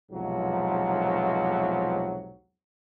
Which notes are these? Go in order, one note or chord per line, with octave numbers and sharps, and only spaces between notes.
B1 E2 G#2 C3 F3 F#3